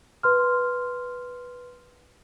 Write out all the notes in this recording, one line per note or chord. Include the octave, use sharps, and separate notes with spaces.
B4 C6 F6